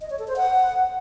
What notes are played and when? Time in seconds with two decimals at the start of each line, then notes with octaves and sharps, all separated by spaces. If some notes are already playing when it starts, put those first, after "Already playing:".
0.01 D#5
0.10 C#5
0.19 A4
0.28 C5
0.37 F#5